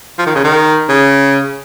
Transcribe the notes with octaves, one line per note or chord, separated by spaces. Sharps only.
F3
D#3
C#3
D#3
C#3